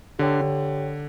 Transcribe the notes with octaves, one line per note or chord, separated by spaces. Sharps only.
D3 G4 C#5 G5
D3